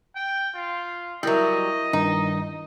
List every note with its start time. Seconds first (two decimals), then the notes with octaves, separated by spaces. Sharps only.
0.16 G5
0.55 F4
1.23 F#3 G3 E4 A#4 D#5 E5
1.93 G2 D#3 D#4